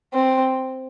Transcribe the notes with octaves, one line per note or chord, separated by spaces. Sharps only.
C4